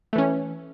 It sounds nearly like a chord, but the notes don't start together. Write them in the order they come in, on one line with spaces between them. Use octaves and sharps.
A3 E3 C#4